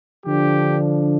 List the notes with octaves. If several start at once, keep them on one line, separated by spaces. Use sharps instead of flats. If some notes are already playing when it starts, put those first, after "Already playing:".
D3 F3 D4 G4